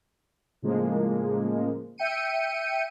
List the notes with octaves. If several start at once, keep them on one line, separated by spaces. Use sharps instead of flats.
A2 C#3 F3 G#3 A#3
E5 G5 C#7 D#7